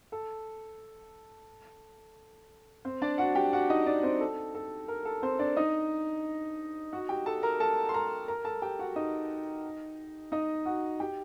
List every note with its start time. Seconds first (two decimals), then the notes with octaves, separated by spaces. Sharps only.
0.12 A4
2.85 C4 C5
3.02 D4 D5
3.18 F#4 F#5
3.35 G4 G5
3.53 F#4 F#5
3.70 D#4 D#5
3.86 D4 D5
4.03 C4 C5
4.20 A4
4.55 A4
4.88 A#4
5.05 A4
5.22 C4 C5
5.39 D4 D5
5.57 D#4 D#5
6.93 F#4 F#5
7.09 G4 G5
7.26 A4 A5
7.43 A#4 A#5
7.60 A4 A5
7.89 C6
7.94 A#4 A#5
8.28 A#4 A#5
8.45 A4 A5
8.62 G4 G5
8.79 F#4 F#5
8.96 D#4 D#5
10.32 D#4 D#5
10.66 F#4 F#5
11.00 G4 G5